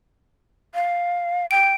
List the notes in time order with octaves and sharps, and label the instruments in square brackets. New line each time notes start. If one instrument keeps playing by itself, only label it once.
[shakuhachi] F5
[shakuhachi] G5 [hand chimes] D7